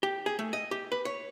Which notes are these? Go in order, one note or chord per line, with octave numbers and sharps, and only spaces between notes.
G4
G#4
A3
D#5
G4
B4
C#5